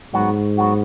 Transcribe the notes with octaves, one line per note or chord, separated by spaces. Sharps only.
G#2 F#3 B3 F#4
F#3 B3 F#4